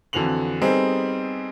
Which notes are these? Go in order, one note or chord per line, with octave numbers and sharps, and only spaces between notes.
F2 D3 E3 F#4 F7 F#7
G3 B3 C4 D#4 G#4 A4